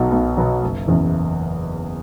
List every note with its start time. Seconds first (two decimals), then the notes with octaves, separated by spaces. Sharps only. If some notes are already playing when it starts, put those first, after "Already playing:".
Already playing: B1 B2 F#3 B3 D#4
0.11 B1 B3
0.37 B2 F#3 B3
0.63 F#1
0.88 E2 C#3 E3